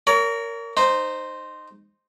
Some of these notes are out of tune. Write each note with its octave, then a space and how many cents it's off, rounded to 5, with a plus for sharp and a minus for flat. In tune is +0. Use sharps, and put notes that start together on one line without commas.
A#4 -10 C#5 +40
D#4 -20 C5 +0